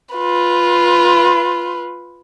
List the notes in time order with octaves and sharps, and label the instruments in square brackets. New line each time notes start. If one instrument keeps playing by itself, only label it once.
[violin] F4 B4